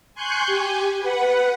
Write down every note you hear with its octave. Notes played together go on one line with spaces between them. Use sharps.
G#5 C6 C#6 F#6 G6
G4 G#5
B4 F#5